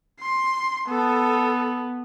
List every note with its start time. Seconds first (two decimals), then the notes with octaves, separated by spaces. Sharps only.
0.20 C6
0.88 B3 A4